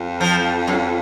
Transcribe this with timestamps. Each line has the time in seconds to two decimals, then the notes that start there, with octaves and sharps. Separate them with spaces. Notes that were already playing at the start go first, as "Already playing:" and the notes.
Already playing: F2
0.21 F3
0.68 F#2